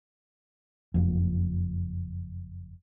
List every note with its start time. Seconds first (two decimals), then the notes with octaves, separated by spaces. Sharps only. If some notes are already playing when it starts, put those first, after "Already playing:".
0.94 F#1 F2